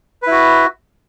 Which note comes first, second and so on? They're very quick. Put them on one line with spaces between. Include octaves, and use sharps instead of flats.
B4 E4 F#4